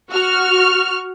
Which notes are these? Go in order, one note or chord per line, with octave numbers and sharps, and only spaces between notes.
F#4 C#6 F6